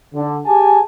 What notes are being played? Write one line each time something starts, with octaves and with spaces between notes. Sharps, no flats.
D3
G4 G#4 G#5 A5